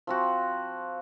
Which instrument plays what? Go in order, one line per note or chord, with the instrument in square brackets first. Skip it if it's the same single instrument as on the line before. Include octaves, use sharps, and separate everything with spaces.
[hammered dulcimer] F3 C4 F#4